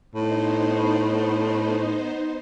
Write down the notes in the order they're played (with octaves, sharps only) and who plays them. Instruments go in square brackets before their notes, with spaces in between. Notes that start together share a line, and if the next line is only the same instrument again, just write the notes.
[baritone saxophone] A2 [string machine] B3 D#4 C5